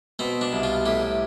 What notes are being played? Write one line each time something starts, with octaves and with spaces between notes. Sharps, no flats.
B2 C4
D4
C2
F4
A2 G4